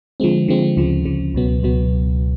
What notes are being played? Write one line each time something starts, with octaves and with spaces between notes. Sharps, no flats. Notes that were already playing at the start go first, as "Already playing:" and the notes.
D3 F3 G#3 C4
D3 F3 G#3 C4
D2 C#3 F3
D2 C#3 F3
C#2 B2 F#3 B3
C#2 B2 F#3 B3